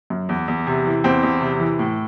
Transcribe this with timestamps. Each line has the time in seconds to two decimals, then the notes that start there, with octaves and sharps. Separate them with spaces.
0.10 F#2
0.29 E2
0.48 E2
0.67 C3
0.86 E3
1.04 E2 C4
1.23 E2
1.41 C3
1.60 E3
1.79 A2